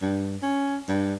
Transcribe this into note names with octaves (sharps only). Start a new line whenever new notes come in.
G2
C#4
G2